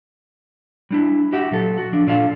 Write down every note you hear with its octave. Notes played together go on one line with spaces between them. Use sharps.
G3 D4 E4
F#4 G4 E5 F#5
A#2 F#3 A4
F#4
F3 D4
A#2 D4 F4 A4 D5 F5